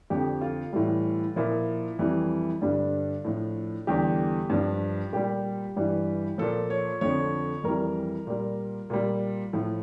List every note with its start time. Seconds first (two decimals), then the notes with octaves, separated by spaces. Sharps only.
0.10 F2 D3 F3 G4
0.41 F4
0.73 A2 E3 G3
1.36 A#2 F3 E4
1.99 F2 E3 G3
2.61 G2 D3 G3 D4
3.25 A2 F3
3.87 E2 D3 G3 G4
4.50 G2 F3
5.12 A#2 G3 G4
5.76 G2 E3 G3
6.38 A#2 F3 A4
6.70 C#5
7.01 F2 D3 F3 C#5
7.64 F2 E3 G3 A#4
8.27 A#2 G3
8.90 A#2 G3
9.53 A2 F3